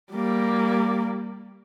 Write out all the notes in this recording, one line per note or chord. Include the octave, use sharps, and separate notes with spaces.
G3 A#3